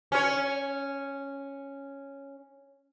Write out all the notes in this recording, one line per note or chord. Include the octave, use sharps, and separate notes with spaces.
C#4 C#5